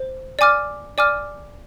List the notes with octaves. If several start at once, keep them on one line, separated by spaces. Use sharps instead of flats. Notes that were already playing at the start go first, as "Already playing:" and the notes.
Already playing: C5
D5 G#5 D6 F6
D5 G#5 D6 F6